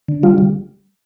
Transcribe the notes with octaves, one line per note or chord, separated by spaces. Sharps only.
D3
G3 F4
G3